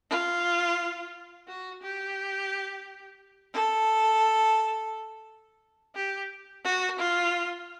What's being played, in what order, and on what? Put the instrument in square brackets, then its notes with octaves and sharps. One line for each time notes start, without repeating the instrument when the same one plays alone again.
[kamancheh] F4
F#4
G4
A4
G4
F#4
F4